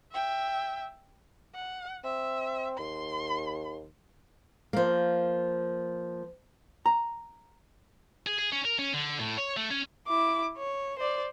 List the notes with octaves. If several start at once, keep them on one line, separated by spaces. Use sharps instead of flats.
E5 G5
F#5
C4 E5
D#2 C6
F3 A#3
A#5
G#4
G#4
C#4
A#4
C#4
D3
A2
C#5
A3
C#4
E4 D6
C#5
C5 D5